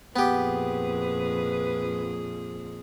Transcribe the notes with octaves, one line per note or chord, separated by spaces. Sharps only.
F2 A#2 B3 G4 G#4 B4